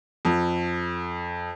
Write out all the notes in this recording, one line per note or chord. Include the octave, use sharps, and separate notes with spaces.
F2